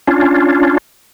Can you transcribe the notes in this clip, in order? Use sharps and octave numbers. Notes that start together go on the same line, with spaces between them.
C#4 D4 F4